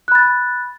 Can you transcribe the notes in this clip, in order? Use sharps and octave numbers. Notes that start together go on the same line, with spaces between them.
B5 F#6 A6